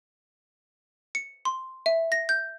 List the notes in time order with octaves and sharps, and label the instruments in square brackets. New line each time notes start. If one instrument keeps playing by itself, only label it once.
[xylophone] C#7
C6
E5
A#6
G6